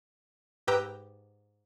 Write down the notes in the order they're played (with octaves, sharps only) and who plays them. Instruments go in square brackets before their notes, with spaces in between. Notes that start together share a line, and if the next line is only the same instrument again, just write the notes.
[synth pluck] G#2 G4 B4 G5 A#5 E6